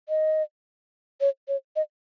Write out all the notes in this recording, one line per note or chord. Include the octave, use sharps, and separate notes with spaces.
D#5
C#5
C#5
D#5